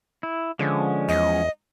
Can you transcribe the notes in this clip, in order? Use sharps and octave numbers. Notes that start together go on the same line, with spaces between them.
E4
D3 F3 G#3 C#4
E2 D#5